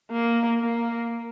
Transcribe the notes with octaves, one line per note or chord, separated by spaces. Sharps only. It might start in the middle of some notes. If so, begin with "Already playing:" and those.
A#3
A#3